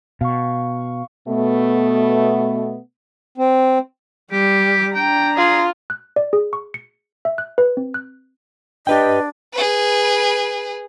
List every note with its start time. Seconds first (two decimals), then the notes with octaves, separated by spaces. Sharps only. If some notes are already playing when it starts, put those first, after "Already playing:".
0.21 B2 F5 C#6
1.27 B2 A3 B3
3.38 C4
4.32 G3 G4
4.94 D4 G5 A#5
5.37 F4 G#4
5.90 F#6
6.16 D5
6.33 G#4
6.53 C#6
6.74 C#7
7.25 E5
7.38 F#6
7.58 B4
7.77 C4
7.94 F#6
8.87 D4 G4 B4 D#5 G5
9.53 G#4 B4